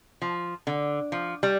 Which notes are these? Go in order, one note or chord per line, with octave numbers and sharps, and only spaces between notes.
F3
D3
F3
G3